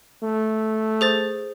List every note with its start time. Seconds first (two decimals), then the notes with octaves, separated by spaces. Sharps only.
0.23 A3
1.01 G#4 C5 A6